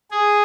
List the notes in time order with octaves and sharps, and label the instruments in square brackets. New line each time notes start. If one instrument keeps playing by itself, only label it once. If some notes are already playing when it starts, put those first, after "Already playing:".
[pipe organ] G#4